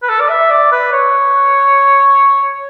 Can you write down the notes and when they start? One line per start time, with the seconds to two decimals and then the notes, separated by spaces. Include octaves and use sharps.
0.03 B4
0.09 A4
0.20 D5
0.29 E5
0.51 D5
0.72 B4
0.92 C#5